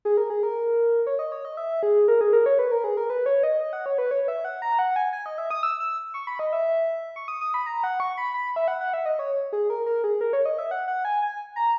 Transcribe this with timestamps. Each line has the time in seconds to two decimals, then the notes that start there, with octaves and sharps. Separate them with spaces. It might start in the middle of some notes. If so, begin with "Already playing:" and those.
0.05 G#4
0.17 A#4
0.30 G#4
0.43 A#4
1.07 C#5
1.19 D#5
1.32 C#5
1.45 D#5
1.57 E5
1.83 G#4
2.08 A#4
2.21 G#4
2.33 A#4
2.46 C#5
2.59 B4
2.71 A#4
2.84 G#4
2.97 A#4
3.10 B4
3.26 C#5
3.43 D#5
3.60 D#5
3.73 F#5
3.86 C#5
3.98 B4
4.11 C#5
4.28 E5
4.45 F#5
4.62 A#5
4.79 F#5
4.96 G#5
5.13 G#5
5.26 D#5
5.38 E5
5.51 D#6
5.63 E6
5.80 E6
6.14 C#6
6.27 B5
6.39 D#5
6.53 E5
7.16 C#6
7.28 D#6
7.41 D#6
7.54 B5
7.66 A#5
7.84 F#5
8.00 C#6
8.18 B5
8.34 B5
8.56 E5
8.68 F#5
8.81 F#5
8.94 E5
9.06 D#5
9.19 C#5
9.53 G#4
9.70 A#4
9.86 A#4
10.04 G#4
10.21 A#4
10.33 C#5
10.45 D#5
10.58 E5
10.71 F#5
10.88 F#5
11.05 G#5
11.22 G#5
11.56 A#5